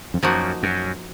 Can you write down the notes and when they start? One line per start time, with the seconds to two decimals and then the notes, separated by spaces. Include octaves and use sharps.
0.14 F2
0.23 F#2 F3 A#3 D#4 F#4
0.63 F#2